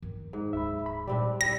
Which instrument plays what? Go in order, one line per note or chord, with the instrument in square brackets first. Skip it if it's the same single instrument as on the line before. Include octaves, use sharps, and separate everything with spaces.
[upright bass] D#3
[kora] G#2
[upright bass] D1 [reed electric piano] E5 B5
[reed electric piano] B5
[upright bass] A#2 [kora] G3 C4 D4 [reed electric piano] D5
[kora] G3 E4 [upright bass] D#4 [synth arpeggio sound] A#6